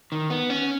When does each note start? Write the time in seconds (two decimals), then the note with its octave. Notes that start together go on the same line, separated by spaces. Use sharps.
0.12 D#3
0.30 B3
0.50 C#4